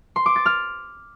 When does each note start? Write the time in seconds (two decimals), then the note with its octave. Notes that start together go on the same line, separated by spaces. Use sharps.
0.16 C6
0.26 D6
0.36 A6
0.46 F6